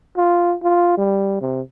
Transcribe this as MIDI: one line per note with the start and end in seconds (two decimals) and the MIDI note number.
0.17 0.55 65
0.63 0.93 65
0.97 1.38 55
1.41 1.61 48